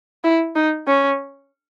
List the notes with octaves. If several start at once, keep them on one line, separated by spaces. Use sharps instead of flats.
E4
D#4
C#4